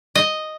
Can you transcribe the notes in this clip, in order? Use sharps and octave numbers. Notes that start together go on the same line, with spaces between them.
D#5